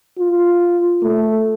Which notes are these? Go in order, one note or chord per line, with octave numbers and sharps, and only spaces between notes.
F4
A3